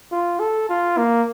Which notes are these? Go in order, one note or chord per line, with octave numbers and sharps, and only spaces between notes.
F4
A4
F4
A#3